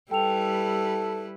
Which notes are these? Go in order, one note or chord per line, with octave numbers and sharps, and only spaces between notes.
G3 E4 A4 B4 G5 F7